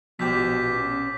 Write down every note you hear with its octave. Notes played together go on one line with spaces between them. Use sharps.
A#1 B2 F3 G4 D6 G6 B6
C#4